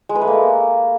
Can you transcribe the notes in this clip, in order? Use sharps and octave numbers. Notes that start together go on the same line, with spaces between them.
G#3
B4
A3
A#3